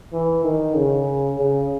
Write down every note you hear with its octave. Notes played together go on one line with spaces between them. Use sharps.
E3
D#3
C#3
C#3